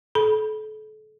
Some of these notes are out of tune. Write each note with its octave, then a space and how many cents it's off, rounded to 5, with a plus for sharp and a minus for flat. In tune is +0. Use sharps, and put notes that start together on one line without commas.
A4 -35 B5 -20